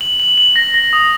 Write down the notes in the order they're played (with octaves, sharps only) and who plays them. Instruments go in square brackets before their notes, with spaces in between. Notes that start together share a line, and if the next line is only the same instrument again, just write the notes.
[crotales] F#7
F#7
F#7
A#6
A#6
D#6